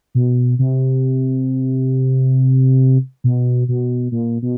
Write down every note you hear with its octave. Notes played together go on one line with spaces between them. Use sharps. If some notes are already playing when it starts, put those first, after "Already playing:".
B2
C3
B2
B2
A#2
B2